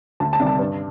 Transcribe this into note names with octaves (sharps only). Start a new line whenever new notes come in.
D2 A5
A5
C3 D#3 G3
A5
G2